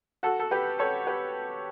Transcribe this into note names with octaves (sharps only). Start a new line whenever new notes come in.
F#4 A4
A4
G4 B4
A4 C#5
G4 B4